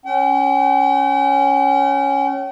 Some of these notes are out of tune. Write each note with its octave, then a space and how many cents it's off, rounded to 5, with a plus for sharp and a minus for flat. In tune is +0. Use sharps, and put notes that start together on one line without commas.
C#4 +0 G5 -40